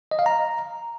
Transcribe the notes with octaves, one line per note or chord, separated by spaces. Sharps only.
D#5
F5
A#5